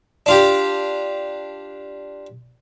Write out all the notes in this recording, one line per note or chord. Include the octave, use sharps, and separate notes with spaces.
D4 F4 G4